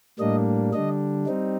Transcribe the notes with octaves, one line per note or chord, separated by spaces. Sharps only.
A2 G3 A#3 D4 D#5
D3 G3 D4 D#5
G3 C4 D#4